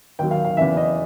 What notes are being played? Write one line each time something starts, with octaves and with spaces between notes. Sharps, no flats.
D#2 D#3 F#3 G5
F5
F5
E2 C#3 E3 E5
D#5